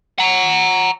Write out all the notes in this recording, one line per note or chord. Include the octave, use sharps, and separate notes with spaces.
F#5 A#5